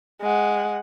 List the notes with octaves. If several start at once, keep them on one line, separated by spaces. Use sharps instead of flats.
G#3 F#5